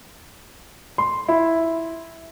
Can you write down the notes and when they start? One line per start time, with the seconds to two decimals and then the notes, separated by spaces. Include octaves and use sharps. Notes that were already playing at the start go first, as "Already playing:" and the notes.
0.98 C6
1.28 E4